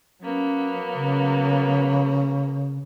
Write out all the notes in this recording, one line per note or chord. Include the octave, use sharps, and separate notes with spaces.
F#3 A#3 B3 C#4
C#3